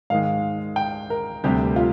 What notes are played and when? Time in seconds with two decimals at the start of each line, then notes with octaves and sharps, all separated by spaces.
0.10 G#2 D#3 G#3 F5
0.76 G5
1.10 A#4
1.44 D2 C3 G3 G4
1.76 F4